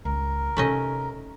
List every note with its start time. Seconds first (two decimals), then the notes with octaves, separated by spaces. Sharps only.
0.05 C#2 A#4
0.57 C3 A3 C#4 D#4 D#5